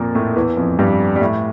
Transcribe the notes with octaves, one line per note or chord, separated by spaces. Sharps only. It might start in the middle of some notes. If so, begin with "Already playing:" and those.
Already playing: F2 A#2 F3 A#3
A2 A3
E2 E3
F2 F3
G2 G3
G3
A2 A3